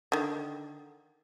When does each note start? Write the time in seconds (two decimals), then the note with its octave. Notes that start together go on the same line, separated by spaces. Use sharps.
0.12 D3 D#3